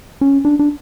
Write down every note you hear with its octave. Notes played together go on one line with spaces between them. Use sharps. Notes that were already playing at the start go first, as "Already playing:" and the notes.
C#4
D4
D4